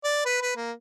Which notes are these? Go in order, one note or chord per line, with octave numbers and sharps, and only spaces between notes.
D5
B4
B4
A#3